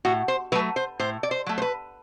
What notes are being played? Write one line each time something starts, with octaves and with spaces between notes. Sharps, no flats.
A2 F#4
C5
F#3 A3 B4
C5
A2 C5
D5
C5
F#3 A3
C5
B4